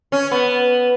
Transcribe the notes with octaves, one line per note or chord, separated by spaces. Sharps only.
C#4
B3